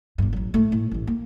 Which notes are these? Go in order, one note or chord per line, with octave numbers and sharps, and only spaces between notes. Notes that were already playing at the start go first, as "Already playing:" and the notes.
G1 G2
A1 F#3
A2 A3
A2
A1 E3
A#3